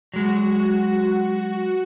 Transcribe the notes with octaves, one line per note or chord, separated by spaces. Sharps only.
F#3 G#3 F#4